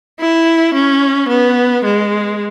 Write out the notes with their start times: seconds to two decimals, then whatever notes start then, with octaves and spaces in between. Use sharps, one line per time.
0.19 E4
0.74 C#4
1.28 B3
1.84 G#3